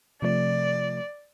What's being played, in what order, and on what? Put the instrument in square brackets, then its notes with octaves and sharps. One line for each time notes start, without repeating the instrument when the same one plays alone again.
[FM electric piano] C3 F3 A3 [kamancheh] D5